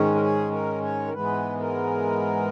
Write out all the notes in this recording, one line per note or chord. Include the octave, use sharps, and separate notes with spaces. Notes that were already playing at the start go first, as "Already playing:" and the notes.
Already playing: G#2 D#3 G#3 C#4
A#4
G#4
A#4
C#5
A#4
G#2 E3 G#3 B3 B4
A#4